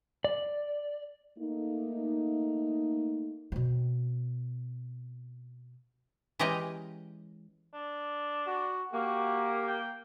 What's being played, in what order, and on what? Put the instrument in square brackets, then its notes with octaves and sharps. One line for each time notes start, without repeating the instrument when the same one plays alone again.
[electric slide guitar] D5
[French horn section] A3 A#3 D#4
[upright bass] B2 C4
[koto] E3 G#3 C#4 G4 D#5 A#5
[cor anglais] D4
[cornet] F#4
[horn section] A#3 [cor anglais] F#4 [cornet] G4
[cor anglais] G5